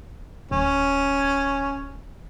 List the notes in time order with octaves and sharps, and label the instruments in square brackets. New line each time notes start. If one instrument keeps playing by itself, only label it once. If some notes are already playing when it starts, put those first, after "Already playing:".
[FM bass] D1 [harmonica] C#4